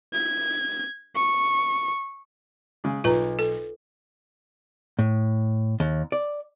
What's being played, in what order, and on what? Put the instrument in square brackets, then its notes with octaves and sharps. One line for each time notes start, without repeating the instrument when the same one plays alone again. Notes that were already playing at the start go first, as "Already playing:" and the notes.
[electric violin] G#6
C#6
[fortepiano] C#3 G#3
[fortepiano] B1 A#5 [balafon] F4 B4
[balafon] A4
[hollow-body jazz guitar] A2
D#2
D5